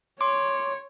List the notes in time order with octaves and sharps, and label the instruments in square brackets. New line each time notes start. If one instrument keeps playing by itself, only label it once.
[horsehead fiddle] C#5 [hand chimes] C6 D6 D7